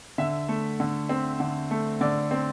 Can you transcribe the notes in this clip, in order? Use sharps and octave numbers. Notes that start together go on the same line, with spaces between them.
D3 E5
A3
D3
C4
D3
A3
D3 D5
C4